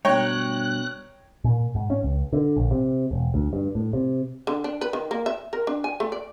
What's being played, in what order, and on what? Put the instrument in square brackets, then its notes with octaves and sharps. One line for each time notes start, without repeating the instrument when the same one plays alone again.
[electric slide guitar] G2 B2 [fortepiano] C#5 G5 A#5 [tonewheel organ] F#6
[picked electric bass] A#2
G#2
C#4
C#2
D3
A#1
C3
E1
D2
G2
A2
C3
[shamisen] D3
D4
B4
D#3
A#3
E5
A#4
D4
G#5
A3
D5